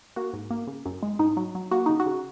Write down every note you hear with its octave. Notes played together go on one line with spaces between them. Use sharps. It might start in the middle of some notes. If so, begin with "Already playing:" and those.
A#3 F#4
G#2
A#3
C#3
F#2
G#3
G#2 D#4
F#3
F#3
A#3 F#4
C#3 D#4
F#4
C#3